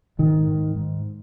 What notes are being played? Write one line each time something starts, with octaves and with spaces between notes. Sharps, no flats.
G#2 D#3
G#2
G#2